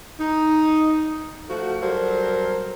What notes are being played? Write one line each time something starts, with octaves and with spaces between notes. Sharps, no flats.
D#4
F3 A3 F#4
F#3 G3 A4 A#4 C5